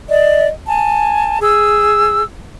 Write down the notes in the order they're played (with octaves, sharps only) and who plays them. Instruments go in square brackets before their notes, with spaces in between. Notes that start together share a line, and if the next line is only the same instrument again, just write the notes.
[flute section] D5 D#5
G#5 A5
G#4 E6